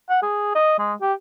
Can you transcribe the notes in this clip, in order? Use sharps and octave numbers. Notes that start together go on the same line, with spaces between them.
F#5
G#4
D#5
G#3
G4